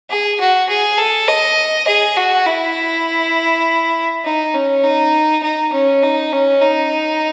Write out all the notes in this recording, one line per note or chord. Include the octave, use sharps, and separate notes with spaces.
G#4
F#4
G#4
A4
D#5
G#4
F#4
E4
D#4
C#4
D#4
D#4
C#4
D#4
C#4
D#4